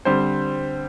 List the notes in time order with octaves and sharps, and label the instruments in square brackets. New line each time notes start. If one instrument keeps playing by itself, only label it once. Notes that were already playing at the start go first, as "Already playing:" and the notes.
[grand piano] D3 G3 C4 C5